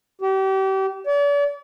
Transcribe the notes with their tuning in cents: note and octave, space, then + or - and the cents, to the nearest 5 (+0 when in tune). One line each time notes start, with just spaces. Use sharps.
G4 -35
D5 -45